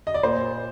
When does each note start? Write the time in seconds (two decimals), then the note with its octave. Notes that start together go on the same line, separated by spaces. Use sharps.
0.07 D#5
0.14 D5
0.23 A#2 C5